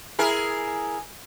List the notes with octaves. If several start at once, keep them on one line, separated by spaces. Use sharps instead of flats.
E4 G#4 A#4